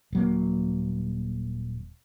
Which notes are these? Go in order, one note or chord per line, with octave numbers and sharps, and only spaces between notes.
D#1 F#3 A#3